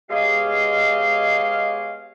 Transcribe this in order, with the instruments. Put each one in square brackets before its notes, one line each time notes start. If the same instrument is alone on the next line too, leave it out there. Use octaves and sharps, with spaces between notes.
[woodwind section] G#3 B3 G4 C#5 D#5 F5